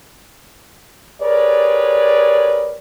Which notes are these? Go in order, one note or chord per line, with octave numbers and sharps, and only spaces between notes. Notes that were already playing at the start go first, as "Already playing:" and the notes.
G4 G#4 A#4 B4 C#5 D5